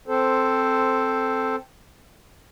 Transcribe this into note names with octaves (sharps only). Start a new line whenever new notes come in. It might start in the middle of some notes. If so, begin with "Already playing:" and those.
C4 A4 C5